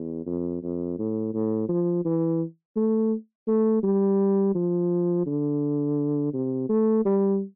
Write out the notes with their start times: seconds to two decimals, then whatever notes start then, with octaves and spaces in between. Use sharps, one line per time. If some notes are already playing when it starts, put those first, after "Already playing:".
Already playing: E2
0.26 F2
0.63 F2
0.98 A2
1.34 A2
1.69 F3
2.05 E3
2.76 A3
3.47 A3
3.83 G3
4.55 F3
5.26 D3
6.34 C3
6.69 A3
7.05 G3